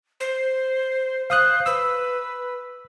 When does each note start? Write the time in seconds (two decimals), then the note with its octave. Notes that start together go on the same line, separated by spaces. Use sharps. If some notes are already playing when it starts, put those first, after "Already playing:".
0.20 C5
1.30 C5 F5 D#6 F#6
1.66 B4 E6